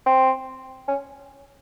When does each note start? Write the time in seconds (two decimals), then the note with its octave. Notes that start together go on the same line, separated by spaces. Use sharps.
0.06 C4
0.88 C#4